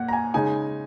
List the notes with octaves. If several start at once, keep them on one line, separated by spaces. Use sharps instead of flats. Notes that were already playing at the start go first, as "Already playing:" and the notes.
Already playing: A#2 F#5
A#5
G#5
C#3 G#3 D#4 G#5